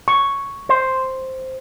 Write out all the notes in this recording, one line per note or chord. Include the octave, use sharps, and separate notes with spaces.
C#6
C5